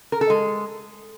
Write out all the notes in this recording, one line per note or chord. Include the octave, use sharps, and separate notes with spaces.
A#4
A4
G#3